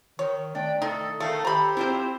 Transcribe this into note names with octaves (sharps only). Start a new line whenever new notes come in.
D#3 C#5
A3 D4 G5
D#3 D#4 A4
D#3 A3 A4 F5
G4 C5 A#5 B5
C4 E4 F4 C5